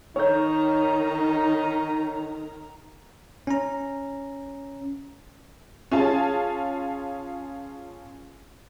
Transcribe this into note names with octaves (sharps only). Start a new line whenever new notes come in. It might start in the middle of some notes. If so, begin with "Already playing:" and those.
D#3 D#4 C#5 A#5 G6
C#4 A#5
C#4 F4 G#4 F5 A5